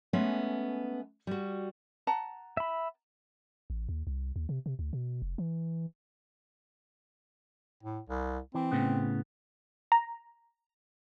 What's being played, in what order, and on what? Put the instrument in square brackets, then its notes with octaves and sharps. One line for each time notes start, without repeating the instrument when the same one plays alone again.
[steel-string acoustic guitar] G#3 A3 B3 C#4
G3 F#4
[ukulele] F#5 A5 A#5
[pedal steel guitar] E5 B5
[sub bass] A1
D#2
C2
D#2
C3
C3
D2
B2
F1
E3
[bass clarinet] A2
C2
[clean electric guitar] E3 [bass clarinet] C4
[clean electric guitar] A2 C#3 B3
[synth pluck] A#5